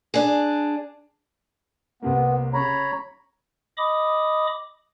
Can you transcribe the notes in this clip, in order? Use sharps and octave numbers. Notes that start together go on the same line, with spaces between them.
D4 G#4
C2 C3 A#3 B3
C#3 C#5 A#5 B5
D#5 B5 D6 D#6